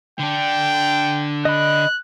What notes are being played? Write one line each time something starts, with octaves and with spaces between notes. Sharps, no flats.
D3 D4 G5
D#5 B5 F#6